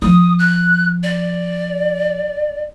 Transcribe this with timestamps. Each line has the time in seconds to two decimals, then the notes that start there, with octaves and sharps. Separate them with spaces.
0.02 F3 D#6
0.39 F#6
1.03 D5